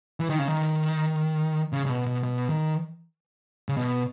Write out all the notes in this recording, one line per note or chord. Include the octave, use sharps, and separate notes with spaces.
E3
D#3
C#3
D#3
C#3
C#3
B2
B2
B2
D#3
C#3
B2